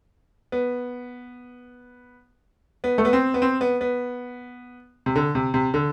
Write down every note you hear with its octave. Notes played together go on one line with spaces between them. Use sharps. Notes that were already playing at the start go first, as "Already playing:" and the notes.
B3
B3
A3
B3
C4
B3
C4
B3
B3
C3
D3
C3
C3
D3